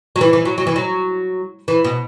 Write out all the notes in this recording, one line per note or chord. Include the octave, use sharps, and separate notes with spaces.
F#3
E3
E3
F#3
F#3
E3
F#3
E3
B2